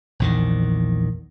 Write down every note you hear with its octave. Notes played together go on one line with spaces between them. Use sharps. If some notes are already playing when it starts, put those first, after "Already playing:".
A#1 E2 D#3